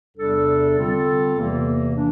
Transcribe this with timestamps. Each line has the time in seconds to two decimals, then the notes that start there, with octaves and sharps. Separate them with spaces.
0.16 E2 C3 G3 D4 A4
0.77 D3 G3 C4 F4 A4
1.36 E2 C3 E3 A#3
1.95 E3 A#3 D4